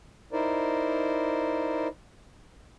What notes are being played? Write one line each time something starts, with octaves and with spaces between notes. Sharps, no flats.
D#4 E4 A#4 C5 D5